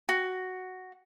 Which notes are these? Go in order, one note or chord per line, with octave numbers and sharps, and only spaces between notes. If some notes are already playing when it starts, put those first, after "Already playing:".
F#4